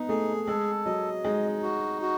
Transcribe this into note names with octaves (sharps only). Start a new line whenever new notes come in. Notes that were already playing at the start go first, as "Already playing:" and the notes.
Already playing: B3 D#4
A3 G#4
G#3 A4
F#3 D#5
G#3 D#4
F#4
F#4